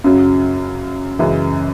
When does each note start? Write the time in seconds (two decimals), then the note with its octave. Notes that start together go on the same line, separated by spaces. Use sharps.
0.04 F#2 C#3 F#3
1.19 F#2 C#3 E3 G#3